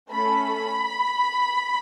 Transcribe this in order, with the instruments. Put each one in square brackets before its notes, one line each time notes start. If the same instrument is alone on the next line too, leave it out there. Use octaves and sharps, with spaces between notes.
[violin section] A3 C#4 A4 B5